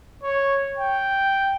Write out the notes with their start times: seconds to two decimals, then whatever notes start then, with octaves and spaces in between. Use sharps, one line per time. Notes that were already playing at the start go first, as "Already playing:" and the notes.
0.23 C#5
0.77 G5